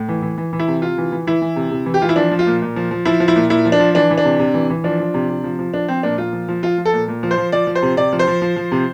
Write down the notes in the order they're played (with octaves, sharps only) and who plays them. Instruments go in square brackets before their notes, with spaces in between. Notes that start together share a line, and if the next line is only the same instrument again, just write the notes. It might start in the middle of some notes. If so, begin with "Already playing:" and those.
Already playing: [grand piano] A2
E3
E3
E3
E3
E4
C3
C3 F4
E3
E3
E3 E4
E3
C3
C3
E3
G4
E3 F4
E4
F3 D4
F3
F4
A#2
A#2
F3
F3
F3 E4
F3
E4
A#2
A#2 E4
F3
D4
F3
E3 D4
E3
D4
C3
C3
E3
E3
F3 D4
F3
C3
C3
F3
F3
F3 D4
F3 C4
A#2 D4
A#2 F4
F3
F3
F3 F4
F3
A4
A#2
A#2
F3
C5
F3
F3 D5
F3
C5
C3
C3 D5
F3
C5
F3
F3
F3
C3